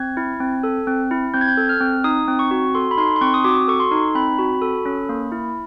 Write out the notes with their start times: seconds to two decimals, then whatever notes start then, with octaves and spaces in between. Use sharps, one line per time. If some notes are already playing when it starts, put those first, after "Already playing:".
Already playing: C4 G#6
0.17 E4
0.40 C4
0.64 A4
0.87 C4
1.11 E4
1.34 C4 G6
1.41 G#6
1.48 G6
1.57 A4
1.69 F6
1.80 C4
2.04 D#4 D#6
2.28 C4
2.39 C#6
2.51 F#4
2.75 A4 C6
2.91 B5
2.98 D#4 C6
3.16 C6
3.21 C4 C#6
3.34 D#6
3.44 F#4 D6
3.68 A4 C#6
3.80 C6
3.91 D#4
4.15 C4 B5
4.39 F#4
4.62 A4
4.85 C#4
5.09 A#3
5.32 E4